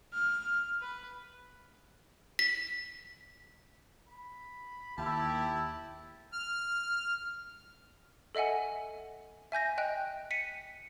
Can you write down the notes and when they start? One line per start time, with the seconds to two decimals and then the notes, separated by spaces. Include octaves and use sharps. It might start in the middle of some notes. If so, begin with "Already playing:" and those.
0.14 F6
0.82 B4
2.39 B6
4.08 B5
4.98 D#2 E4 G4 A5
6.33 F6
8.35 A4 D#5 E5 F#5 G#5
9.52 E5 G#5 G6 A#6
9.78 D#5 G5 F#6
10.31 B6 C#7 D#7